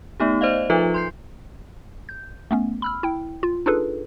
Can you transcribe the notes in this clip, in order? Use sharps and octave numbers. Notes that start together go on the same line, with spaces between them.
A3 B3 D#4 G4
C5 D5 D#5 F5
F3 D#4 F4 A4 B4 E5
C6 G6 C7
G6
A3 B3 C#4
B5 E6 F6
E4 G5
F4
D4 D#4 F4 G#4 A4 B4